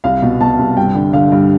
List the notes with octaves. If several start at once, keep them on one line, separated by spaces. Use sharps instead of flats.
C2 F5
B2
B2 A5
C2
G2 G5
D3
D3 F5
G2